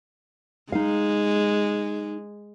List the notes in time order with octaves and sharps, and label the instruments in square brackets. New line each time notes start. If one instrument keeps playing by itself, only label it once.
[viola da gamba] G#3 [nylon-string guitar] D#4 F5